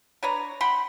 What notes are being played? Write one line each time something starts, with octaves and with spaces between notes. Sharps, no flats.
D4 B4 C#5 A#5
F#5 G5 B5 C6